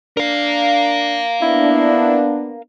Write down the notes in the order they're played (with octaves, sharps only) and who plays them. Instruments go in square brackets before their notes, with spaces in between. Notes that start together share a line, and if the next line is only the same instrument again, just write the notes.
[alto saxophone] D4 [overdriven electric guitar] A#4 F5
[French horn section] B3 D4 [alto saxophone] E4